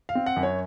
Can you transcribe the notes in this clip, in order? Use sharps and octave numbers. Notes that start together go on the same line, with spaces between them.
F5
C4
F#5
F#2
C#5